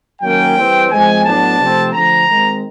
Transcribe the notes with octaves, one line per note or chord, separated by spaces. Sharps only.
D#3 F#3 A#3 C#4 G5
E3 G3 C4
F3 G#3 C4 G#5
A2 F#3 B3 D4 A5
C3 F3 A3 C4
D3 F3 A3 A#5
D#3 G#3 C4